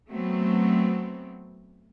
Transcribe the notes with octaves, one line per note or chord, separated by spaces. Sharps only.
F#3 A3 B3 C4